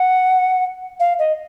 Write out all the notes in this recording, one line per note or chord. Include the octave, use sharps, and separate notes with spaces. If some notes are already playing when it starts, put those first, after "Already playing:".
Already playing: F#5
F5
D#5